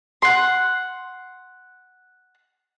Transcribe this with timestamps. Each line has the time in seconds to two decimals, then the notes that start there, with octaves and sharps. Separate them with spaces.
0.22 F#5 C6